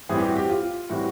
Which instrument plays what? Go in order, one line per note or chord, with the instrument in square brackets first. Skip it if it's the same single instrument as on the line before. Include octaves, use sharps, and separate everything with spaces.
[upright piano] A2 E3 G3 C4 G#4
G4
F#4
G4
F4
A2 E3 G3 C4 F#4